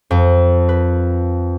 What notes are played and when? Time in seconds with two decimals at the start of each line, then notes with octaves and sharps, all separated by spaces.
0.11 F2
0.69 B4